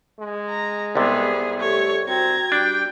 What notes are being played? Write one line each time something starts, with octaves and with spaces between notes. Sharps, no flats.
G#3
A#5
C2 C3 B3 G#4
A3 G4 A4 C#5
C4 F#4 A#5 G#6
G3 D4 G5